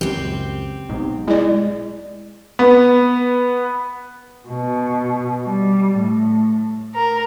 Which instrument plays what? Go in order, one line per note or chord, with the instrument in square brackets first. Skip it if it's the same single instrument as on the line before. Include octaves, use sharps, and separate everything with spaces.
[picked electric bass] C#2 F#2 [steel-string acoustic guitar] C4 G4
[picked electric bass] B1 G#2 C3
[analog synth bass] G#3 [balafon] E4 D5
[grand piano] B3
[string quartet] B2
G3
A2
A#4